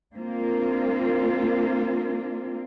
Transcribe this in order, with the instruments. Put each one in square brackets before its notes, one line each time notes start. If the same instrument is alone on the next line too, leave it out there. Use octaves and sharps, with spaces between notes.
[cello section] A#3 C4 D4 F4